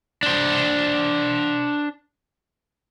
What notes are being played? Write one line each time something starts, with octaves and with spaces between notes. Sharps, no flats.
D4 C5